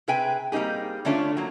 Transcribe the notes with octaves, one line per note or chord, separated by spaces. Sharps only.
C3 G#4 B4 E5 G5 G#5
G3 A#3 C4 D#4 G4 G#4
D3 A3 C#4 D4 F4 C#5
F#3 A#3